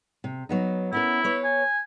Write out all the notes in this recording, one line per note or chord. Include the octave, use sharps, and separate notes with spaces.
C3
F#3 B3 D#4
B3 C#4 E4 A#4
B4 C#5
G#5